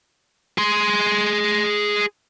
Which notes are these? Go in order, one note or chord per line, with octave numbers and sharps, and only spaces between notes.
G#4 C6